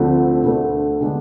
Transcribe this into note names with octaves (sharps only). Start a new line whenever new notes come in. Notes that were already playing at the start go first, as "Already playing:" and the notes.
Already playing: D2 D3 F3 A3 C4
D2 D3 A3
D3 G#3 B3 D4